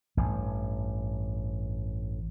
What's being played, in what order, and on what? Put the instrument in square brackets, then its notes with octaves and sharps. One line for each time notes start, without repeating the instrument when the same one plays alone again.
[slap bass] A1 G2